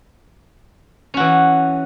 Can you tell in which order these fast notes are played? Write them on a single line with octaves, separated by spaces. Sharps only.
C#4 F#4 E3